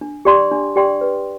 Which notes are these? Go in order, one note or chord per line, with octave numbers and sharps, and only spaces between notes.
D4
G4 D5 G5 C6
D4
G4 D5 G5 C6
B4